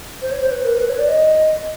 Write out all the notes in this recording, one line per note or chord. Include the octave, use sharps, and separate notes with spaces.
C5
C#5
C5
B4
A#4
B4
C#5
D5
D#5